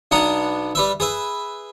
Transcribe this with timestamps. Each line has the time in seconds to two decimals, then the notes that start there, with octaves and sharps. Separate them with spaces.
0.11 B1 B3 D4 F#5 A#5 D#6
0.75 G3 B4 E5
1.00 G#4 B4 E5